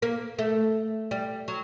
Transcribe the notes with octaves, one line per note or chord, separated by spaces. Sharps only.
A#3
A3
G3
F#3